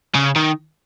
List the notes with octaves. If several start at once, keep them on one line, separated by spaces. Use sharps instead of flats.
C#3
D#3